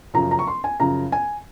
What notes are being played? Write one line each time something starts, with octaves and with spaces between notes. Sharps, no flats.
F#2 C#3 F3 A#5
A#5
C#6
C6
G#5
F#2 C#3 F3 A#5
G#5